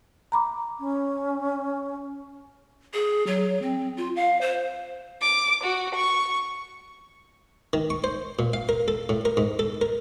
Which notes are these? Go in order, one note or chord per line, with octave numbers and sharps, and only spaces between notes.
A#5 B5 D6
C#4
G#4
F#3
C4
F4
F5
C5
D6
F#4
C#6
D#3
C#6
C5
A#2
F5
A#4
A4
A2
A#4
G#2
A4
A#4